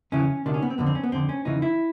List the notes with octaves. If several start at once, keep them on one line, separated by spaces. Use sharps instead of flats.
F2 C#3 E3 C#4
D2 C3 D#3 D4
C#4
B3
C4
F2 D3 B3
C4
C#4
B3
F2 D3 C4
C#4
F2 C#3 E3 D#4
E4